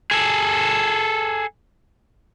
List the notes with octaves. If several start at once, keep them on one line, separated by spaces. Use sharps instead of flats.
G#4 A4